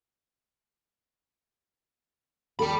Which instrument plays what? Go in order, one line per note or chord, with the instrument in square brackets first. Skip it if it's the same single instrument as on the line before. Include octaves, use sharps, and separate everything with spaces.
[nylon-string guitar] D#2 G#4 A4 [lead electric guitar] G5 B5